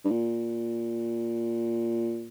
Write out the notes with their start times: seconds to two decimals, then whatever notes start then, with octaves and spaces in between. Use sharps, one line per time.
0.05 G2
0.11 A#2